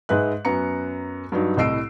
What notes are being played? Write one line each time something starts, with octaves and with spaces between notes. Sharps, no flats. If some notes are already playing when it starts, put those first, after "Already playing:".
G#2 G#3 B4 E5 F#6
F#2 B3 A#5 C#7
G2 F#3 D#4
C2 A2 D#5 E6 C7 D7